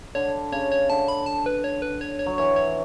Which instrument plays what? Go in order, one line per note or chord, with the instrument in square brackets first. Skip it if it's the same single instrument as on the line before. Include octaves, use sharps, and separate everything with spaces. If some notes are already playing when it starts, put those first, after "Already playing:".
[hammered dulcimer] D3 [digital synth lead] C#5
[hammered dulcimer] C#3 [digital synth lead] C#5
[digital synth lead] C#5
[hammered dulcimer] D3 [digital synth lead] A5
[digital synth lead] B5
A5
B4
C#5
B4
C#5
C#5
[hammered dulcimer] F#3
[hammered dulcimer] E3 [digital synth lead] C#5
[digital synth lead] C#5